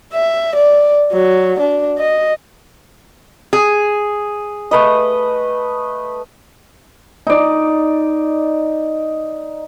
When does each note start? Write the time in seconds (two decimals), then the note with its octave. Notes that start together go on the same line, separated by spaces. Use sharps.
0.13 E5
0.55 D5
1.12 F#3
1.60 D4
1.98 D#5
3.53 G#4
4.71 A3 B4 D#5
7.27 D#4 D5